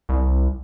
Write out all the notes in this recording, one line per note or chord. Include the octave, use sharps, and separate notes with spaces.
C2